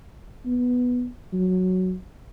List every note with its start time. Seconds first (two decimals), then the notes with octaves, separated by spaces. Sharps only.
0.46 B3
1.33 F#3